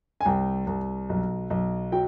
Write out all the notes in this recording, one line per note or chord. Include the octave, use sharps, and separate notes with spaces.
G#5
C2 G5
C2
B1
B1
F#3 G5